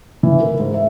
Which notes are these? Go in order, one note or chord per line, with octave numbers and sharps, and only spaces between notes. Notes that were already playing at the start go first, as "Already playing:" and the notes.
E3
A#4
G#2
E5